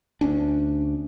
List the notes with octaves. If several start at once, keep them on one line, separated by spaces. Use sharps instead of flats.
D2 C#4 D4